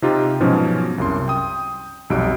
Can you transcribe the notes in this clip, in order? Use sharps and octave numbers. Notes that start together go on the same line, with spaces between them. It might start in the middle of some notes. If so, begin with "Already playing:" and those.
C3 C4 D#4 F4 G4
G#2 B2 F3 F#3 C#4
C2 F#2 C6
G5 D#6
B1 F2 G3 F#4 E6 D7